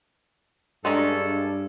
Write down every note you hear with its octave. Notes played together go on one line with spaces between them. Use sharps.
G2 G#3 C#4 D4 A4 A#5